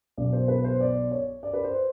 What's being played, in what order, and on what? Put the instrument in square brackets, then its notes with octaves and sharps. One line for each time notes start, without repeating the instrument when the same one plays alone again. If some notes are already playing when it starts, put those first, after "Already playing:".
[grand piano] B1 B2 F#3 D5
C5
B4
C5
D5
C#5
D5
B4
C5